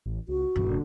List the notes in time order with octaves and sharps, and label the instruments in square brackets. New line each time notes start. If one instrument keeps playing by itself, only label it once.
[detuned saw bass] A1
[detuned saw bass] C#2 [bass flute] F#4
[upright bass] D#1 G2 [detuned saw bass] E3
[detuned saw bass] D3